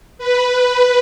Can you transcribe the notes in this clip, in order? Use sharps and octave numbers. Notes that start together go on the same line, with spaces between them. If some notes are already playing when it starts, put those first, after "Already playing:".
B4